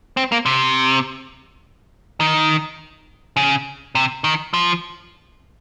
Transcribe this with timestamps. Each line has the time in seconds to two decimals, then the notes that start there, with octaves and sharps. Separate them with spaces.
0.17 C4
0.32 A#3
0.46 C3
2.20 D#3
3.37 C#3
3.95 C3
4.24 D#3
4.54 F3